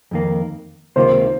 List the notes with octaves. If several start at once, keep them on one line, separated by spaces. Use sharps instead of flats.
F2 D#3 A#3
C#2 C3 D#3 A#3 F4 C5